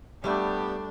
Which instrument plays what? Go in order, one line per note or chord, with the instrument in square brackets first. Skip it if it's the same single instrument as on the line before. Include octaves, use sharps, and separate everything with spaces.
[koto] G3 A3 [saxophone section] B3 G4 [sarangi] D4